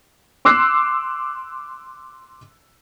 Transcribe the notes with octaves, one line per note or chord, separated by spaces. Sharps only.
C6 D6 E6 F#6 C7